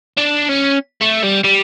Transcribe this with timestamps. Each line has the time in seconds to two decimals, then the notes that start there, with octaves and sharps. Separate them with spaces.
0.17 D4
0.49 C#4
1.02 A3
1.24 G3
1.44 G3